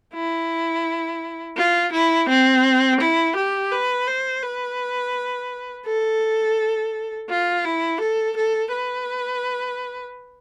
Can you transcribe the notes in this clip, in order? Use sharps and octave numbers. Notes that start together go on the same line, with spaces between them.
E4
F4
E4
C4
E4
G4
B4
C5
B4
A4
F4
E4
A4
A4
B4